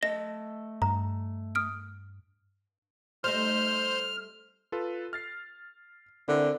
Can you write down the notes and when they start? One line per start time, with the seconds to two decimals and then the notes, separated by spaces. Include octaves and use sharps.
0.03 A3 D#5 A#6
0.82 G2 A#5
1.55 D#6 F6 D7
3.24 G3 A3 D#4 C5 F6
4.72 F4 A4 B4
5.13 F6 A6 C7
6.28 D3 C4 E4 A#4